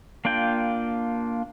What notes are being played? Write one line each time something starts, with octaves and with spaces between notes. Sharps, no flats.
A#3 D4 F4 G5